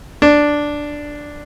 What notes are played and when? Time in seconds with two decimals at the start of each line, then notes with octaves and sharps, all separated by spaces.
0.22 D4